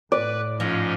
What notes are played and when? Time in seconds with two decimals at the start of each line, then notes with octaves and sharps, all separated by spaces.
0.12 A2 B4 D5
0.60 G#2 F3 C#4 D#5